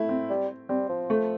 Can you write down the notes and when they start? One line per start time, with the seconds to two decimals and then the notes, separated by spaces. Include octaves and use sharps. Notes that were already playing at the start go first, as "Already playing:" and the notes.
Already playing: A3 E4
0.09 C4
0.30 G3
0.69 G3 C4
0.89 F3
1.10 A3